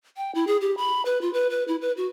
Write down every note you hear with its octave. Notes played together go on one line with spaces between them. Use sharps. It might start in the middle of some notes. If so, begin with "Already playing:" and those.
G5
E4
G#4
G4
B5
B4
F4
B4
B4
E4
B4
F#4